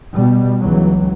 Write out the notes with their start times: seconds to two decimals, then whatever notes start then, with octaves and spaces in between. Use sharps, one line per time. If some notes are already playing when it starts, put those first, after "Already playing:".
0.14 B2 G3
0.61 C#2 E3 F#3